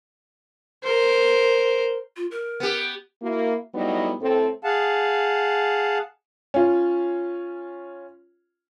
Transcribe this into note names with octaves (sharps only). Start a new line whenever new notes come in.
A#4 C5
F4
A#4
B3 G4
A#3 E4 F#4
F#3 G3 A3 B3 D#4 E4
A2 C4 A4
G#4 F5 F#5 A5
C#4 F4